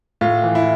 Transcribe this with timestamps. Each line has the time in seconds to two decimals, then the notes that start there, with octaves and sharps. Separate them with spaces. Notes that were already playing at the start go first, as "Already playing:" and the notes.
0.21 A2 F4
0.43 E3
0.55 E4